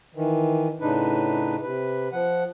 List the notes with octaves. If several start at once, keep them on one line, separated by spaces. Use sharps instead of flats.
D#3 E3
A2 C#3 D4 D#4 B4
C3 B4
F3 F#5